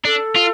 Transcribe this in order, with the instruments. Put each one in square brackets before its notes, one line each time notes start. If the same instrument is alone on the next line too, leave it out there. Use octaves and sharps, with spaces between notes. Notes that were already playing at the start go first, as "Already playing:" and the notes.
[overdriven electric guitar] D4 [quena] A4
[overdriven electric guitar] F4